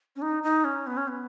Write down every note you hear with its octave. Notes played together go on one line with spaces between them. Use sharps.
C#4
D#4
D#4
C#4
B3
C#4
B3